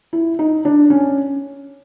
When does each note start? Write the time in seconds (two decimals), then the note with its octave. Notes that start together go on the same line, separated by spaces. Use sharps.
0.13 E4
0.39 D#4
0.65 D4
0.90 C#4